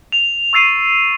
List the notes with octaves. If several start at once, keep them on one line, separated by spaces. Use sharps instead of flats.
F7
C#6 E6 A6 C7 D#7 F7